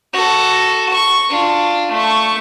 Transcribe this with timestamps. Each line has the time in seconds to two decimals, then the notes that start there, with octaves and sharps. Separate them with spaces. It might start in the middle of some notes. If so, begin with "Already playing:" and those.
0.13 F#4 A4
0.94 C#6
1.30 D4 F4
1.92 A3 C#6